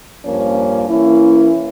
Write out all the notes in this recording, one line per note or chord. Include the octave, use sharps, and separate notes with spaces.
G2 F3 A#3 C#4
E3 A#3 C#4 E4